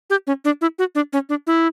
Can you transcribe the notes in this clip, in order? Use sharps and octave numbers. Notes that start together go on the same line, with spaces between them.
G4
C#4
D4
E4
F#4
D4
C#4
D4
E4